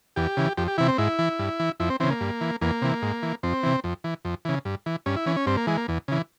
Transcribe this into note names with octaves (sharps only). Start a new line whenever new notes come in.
E2 G4
C#3 E3
F2 G4
G4
C3 E3 E4
C4
G#2 E4
E3
G2
E3
F2 E4
C4
C#3 E3 C4
A#3
G2
E3
E2 A#3
C3 E3
G#2
E3
F2 C4
C3 E3
F2
E3
F2
C#3 E3
G2
E3
G2 C#4
E4
E3 C#4
C#4
G2 C4
A#3
E3 G#3
A#3
E2
C#3 E3